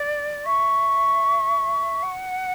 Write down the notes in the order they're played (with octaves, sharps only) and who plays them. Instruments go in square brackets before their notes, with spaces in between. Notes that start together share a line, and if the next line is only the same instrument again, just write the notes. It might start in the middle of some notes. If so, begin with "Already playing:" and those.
Already playing: [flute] D5
[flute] E5 [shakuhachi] C#6
[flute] F#5